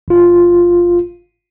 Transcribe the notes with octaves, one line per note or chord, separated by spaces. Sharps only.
G1 F4